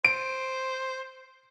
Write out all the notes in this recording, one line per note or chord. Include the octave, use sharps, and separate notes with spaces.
C5 D7